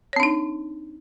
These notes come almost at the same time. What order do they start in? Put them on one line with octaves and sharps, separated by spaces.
C#5 C4 D4 D#4